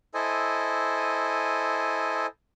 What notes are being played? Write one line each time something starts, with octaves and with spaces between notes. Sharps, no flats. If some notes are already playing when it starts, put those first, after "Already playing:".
E4 A4 C5 D#5 G#5